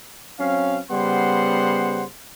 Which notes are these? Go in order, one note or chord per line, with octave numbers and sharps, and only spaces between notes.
F#3 C4 C#4 F5
C#3 G3 B3 C5 F#5 C6